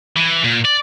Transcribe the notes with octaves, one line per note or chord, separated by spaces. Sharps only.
E3
A#2
D5